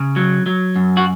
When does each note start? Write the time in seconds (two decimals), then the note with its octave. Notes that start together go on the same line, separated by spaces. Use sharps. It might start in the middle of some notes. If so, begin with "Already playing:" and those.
Already playing: C#3
0.16 F#3
0.46 F#3
0.76 F#2
0.97 F#4